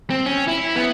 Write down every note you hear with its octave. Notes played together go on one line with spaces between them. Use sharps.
C4
C#4
E4
B3